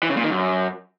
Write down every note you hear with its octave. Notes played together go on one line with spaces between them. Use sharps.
E3
C#3
A#2
D#3
F#2